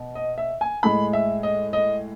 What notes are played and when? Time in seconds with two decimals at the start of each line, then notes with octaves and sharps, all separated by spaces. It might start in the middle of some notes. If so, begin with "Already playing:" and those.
Already playing: B2
0.15 D#5
0.38 E5
0.61 G#5
0.83 A2 G#3 B5
1.13 E5
1.43 D#5
1.73 D#5